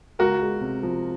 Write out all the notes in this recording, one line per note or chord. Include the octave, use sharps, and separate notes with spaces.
C#2 F#4 A#4
G#3
C3
F3